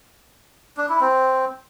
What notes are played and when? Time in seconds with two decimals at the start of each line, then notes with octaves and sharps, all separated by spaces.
0.77 D4
0.89 E4
1.01 C4